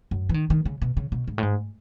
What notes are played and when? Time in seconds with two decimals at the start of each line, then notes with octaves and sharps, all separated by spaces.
0.11 F#2
0.29 E3
0.34 D#3
0.50 D#3
0.65 C#3
0.82 B2
0.97 C#3
1.12 B2
1.28 G#2
1.38 A2
1.43 G#2